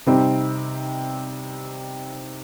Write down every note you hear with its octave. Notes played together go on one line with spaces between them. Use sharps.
C3 G3 C4 D#4 G4